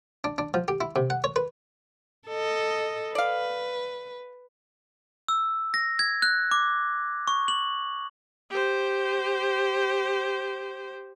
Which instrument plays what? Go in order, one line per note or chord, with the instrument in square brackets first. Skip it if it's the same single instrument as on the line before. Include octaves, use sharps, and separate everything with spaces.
[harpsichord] D4
D4
F3
G4
E4
C3
F#5
C#5
B4
[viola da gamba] A4 D#5
[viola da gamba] B4 [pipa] D5 F5
[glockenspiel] E6
A#6
G#6
F#6
D6
C#6
F#7
[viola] G4 C5